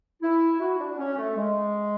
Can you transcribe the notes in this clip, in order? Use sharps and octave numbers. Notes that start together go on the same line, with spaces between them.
E4
F#4
D4
C#4
A3
G#3